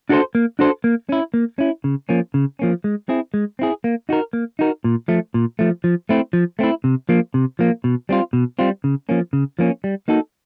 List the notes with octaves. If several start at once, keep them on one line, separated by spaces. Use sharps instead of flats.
D4 F#4 A4 C5
A#3
D4 F#4 A4 C5
A#3
C#4 E4
A#3
C#4 E4
C#3
F3 A#3 C#4
C#3
F3 A#3 C#4
G#3
C4 E4 G#4
G#3
C4 E4 G#4
A#3
D#4 F#4 A#4
A#3
D#4 F#4 A#4
A#2
F3 A3
A#2
F3 A3
F3
A3 C4 E4
F3
A3 C4 E4
C3
F3 A#3
C3
F3 A#3
B2
G3 C4 F4
B2
G3 C4 F4
C#3
F3 A#3 C#4
C#3
F3 A#3 C#4
G3
A#3 D#4 F#4 A4